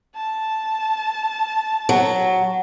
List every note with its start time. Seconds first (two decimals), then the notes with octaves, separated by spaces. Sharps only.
0.15 A5
1.89 F#3